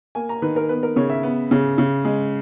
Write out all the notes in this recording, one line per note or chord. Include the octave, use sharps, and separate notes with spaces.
A#3 G#5
A#5
D#3 B4
A#4
B3 B4
A#4
C#3 C#5
E5
B3
C#3
C#3
G#3